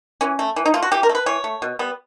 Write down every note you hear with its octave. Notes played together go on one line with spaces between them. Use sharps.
E3 C#4
A3
E3
D#4
A3 F4
F#4
E3 G4
A#4
A3
B4
E3 C#5
A3
B2
G3 B3